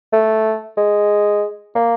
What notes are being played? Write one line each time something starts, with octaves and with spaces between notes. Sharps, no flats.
A3
G#3
A#3